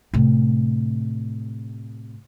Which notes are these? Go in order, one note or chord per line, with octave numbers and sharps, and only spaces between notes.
A2 C3